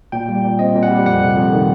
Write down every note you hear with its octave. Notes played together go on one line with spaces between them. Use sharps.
A#2 G5
G3
A#2
C4 D#5
A#2
F#5
G3
F2 F#5
C3
F2
D#3